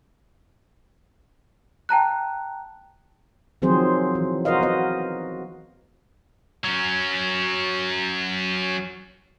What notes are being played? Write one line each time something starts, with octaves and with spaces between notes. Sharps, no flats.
G5 A5 A#5 F#6
D#3 F3 F#3 C4 G#4 C5
E3
F#4 A#4 C5 D#5 F5
B3 D#5
F#3 C#4